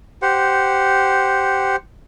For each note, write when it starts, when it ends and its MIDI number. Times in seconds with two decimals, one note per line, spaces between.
0.22 1.76 67
0.22 1.76 72
0.22 1.76 78